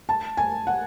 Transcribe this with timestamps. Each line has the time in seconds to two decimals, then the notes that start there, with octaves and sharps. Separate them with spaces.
0.09 A5
0.37 G#5
0.67 F#5